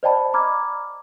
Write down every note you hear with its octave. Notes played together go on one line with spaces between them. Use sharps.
C5 D5 D#5 G5 A5 B5
A#5 B5 D6 F6 G#6